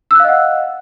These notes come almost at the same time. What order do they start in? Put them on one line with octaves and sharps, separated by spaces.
E6 F#6 F5 D#5 F#5